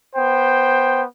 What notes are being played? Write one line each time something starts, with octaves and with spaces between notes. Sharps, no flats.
B3 C5 G5